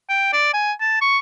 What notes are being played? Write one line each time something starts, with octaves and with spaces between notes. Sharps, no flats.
G5
D5
G#5
A5
C#6